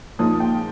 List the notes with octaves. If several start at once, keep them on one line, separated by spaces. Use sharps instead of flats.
A#2 F3 G#3 D#4 D#6
G5